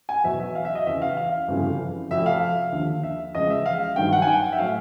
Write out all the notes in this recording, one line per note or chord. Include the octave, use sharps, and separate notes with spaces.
G#5
E2 B2 F#3 E5
E5
F5
E5
D#5
E2 C#3 E3 E5
F5
F5
G1 F2 C#3 E3
F1 F2 C3 E5
F5
D#2 D3 F3
E5
E2 C#3 F3 G#3 D#5
E5
F5
G2 D#3 F#3 G5
F#5
G#5
G5
E5
A2 F#3 F5